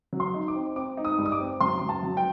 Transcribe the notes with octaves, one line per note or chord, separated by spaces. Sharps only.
F#3
C6
D#4
D6
C4
C4 D6
D#4
D#6
G2
D#6
D6
C4
F#2 C6
F#2
A5
F#3
G5